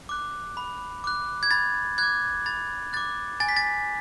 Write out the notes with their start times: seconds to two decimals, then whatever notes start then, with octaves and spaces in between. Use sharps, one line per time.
0.09 D6 F#6
0.57 B5
1.04 D6 F#6
1.43 G#6
1.51 B5 A6
1.98 D6 F#6 G#6
2.46 B5 A6
2.93 D6 F#6 A6
3.40 G#5 A6
3.49 B6
3.57 A6